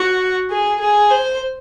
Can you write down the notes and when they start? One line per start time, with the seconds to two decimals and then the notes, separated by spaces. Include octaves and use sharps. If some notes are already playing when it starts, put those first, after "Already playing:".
Already playing: F#4
0.50 G#4
0.80 G#4
1.11 C5